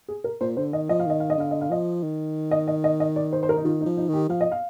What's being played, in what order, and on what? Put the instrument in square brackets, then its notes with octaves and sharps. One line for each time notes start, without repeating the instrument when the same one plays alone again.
[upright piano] G#4
A#4
[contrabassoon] A#2 [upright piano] C5
[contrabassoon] D3 [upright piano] C5
[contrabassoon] D#3 [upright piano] D#5
[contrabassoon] F3 [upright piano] D#5
[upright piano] F5
[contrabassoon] D#3 [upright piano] D#5
[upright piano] F5
D#5
[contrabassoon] D3 [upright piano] F5
[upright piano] D#5
F5
[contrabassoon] F3 [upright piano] D#5
[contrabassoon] D#3
[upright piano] D#5
D#5
D#5
D#5
D5
C5
C5
A#4
D#4
[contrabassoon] D#3 [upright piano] F4
[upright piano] D#4
[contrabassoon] F3
[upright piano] D#4
[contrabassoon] D#3 [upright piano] G4
[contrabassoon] F3 [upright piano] F5
[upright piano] D#5
F5